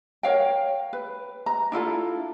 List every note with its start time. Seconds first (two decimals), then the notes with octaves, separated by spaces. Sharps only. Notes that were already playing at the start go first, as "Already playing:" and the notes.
0.23 A#4 C#5 F5 G5
0.93 B4
1.46 A#5
1.72 D4 E4 F4 A4